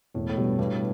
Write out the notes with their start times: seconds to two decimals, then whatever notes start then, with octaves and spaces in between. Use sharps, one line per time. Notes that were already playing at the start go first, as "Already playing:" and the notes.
0.15 E1 A2
0.29 A2
0.37 E2 B2 G3
0.44 G2
0.58 G2 B2